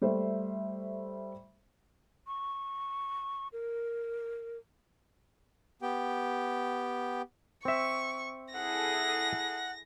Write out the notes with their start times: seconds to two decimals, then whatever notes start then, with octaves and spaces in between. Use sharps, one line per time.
0.02 G3 A3 C5 E5
2.27 C#6
3.53 A#4
5.82 B3 G4 G5
7.65 C4 E5 C#6
8.54 E4 G#4 A4 F#5 A#6